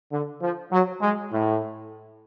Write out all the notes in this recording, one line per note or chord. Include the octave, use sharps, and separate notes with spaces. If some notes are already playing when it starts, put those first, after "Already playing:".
D3
F3
F#3
G#3
A2